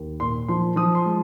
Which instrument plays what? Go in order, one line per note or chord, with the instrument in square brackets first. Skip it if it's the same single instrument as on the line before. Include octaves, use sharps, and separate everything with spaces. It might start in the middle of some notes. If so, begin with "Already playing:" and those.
Already playing: [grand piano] D#2
A#2 C6
F3 C6
F3 D#6
C6
G#3